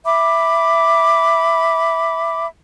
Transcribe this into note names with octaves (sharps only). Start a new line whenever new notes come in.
E5 B5 D6